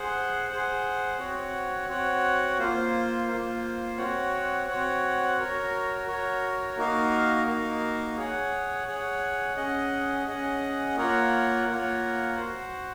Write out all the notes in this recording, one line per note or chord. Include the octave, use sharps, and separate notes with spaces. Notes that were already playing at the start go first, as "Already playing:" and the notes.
Already playing: G#4 C5 F#5
G#4 C5 F#5
C4 F#4 C#5 F#5
C4 F#4 C#5 F#5
A#3 F4 C5
A#3 F4 C5
C4 F#4 C#5 F#5
C4 F#4 C#5 F#5
F#4 A#4 C#5
F#4 A#4 C#5
A#3 D#4 F#4 A#4 F5
A#3 D#4 F#4 A#4 F5
G#4 C#5 F#5
G#4 C#5 F#5
C#4 G#4 D#5 F#5
C#4 G#4 D#5 F#5
A#3 F4 A#4 C#5 F#5
A#3 F4 A#4 C#5 F#5
F#4 C5 F#5